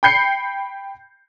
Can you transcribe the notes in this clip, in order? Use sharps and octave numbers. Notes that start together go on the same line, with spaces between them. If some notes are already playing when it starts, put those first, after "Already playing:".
G5 B5 G6 C7 C#7